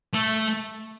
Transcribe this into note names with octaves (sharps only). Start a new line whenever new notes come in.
A3